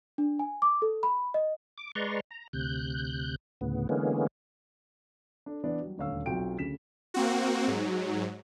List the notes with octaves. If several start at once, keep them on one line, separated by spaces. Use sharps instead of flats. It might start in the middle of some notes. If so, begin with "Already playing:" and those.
D4
G#5
D6
A4
B5
D#5
D6
G#3 B4 D5 A#5 C6 C#6
A#5
D2 C3 F#6 G6
D2 A2 C#3 B3
D3 E3 G#3 A#3 B3 C#4
D4 A4
E3 B3 D4 E4 D5
F#3 G3
D#1 D2 C#5 F5 E6
B1 C4 F4 F#4 G5 D7
D2 C#3 B6 E7
A#3 C4 F#4
G#2 F#3